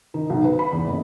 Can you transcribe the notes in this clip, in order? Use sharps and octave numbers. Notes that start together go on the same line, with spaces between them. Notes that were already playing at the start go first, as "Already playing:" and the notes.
D#3
B1
B4
B5
E2
F#1